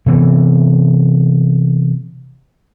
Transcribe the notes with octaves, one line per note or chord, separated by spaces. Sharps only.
C3 E3 B3